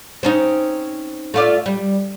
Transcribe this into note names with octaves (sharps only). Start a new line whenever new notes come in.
C4 C#4 D#4
A3 F4 D5
G3